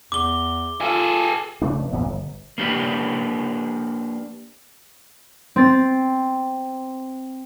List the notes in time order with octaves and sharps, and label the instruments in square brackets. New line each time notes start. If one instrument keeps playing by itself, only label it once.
[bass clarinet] E2 [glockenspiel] D6 G7
[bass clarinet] F4 [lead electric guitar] G#4 A4
[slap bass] C#3 A3 D4
F1
B1 E2 A#2 B3
G1
[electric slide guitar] A#3 D4 G4 B4
[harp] C4 A6